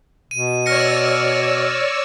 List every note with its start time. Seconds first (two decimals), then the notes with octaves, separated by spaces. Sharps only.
0.31 B2 D#7
0.66 C#5 D5 E6 F6 A#6 C#7